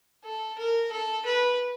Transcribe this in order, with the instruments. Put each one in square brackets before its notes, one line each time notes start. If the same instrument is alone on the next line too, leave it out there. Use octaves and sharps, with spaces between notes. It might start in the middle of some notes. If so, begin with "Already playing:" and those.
[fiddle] A4
A#4
A4
B4